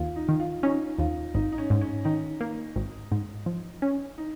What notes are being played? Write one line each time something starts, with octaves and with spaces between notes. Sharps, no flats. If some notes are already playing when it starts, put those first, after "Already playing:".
Already playing: D#2 F4
D#4
D#3
F4
C#4 D#4
D#2 F4
G#1 D#4
D#4
C#4
G#2
C#4
D#3 D#4
A#3
G#1
G#2
F3
C#4
D#4